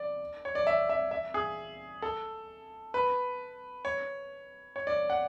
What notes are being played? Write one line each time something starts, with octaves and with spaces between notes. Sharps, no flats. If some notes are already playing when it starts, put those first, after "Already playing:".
Already playing: D5
C#5
D5
E5
E5
E5
G#4
A4
B4
C#5
C#5
D5
F#5